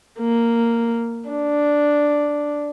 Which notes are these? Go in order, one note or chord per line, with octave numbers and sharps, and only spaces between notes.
A#3
D4